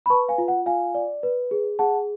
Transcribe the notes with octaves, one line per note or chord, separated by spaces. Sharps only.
B5
B4 A5 C#6
F5 G#5
F4
F#5
F4 F5 G#5
D5
B4
G#4
G#4 F#5 A5